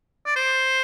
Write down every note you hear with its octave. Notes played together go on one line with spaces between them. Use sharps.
D5
C5